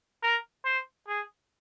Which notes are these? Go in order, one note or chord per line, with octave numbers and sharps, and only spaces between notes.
A#4
C5
G#4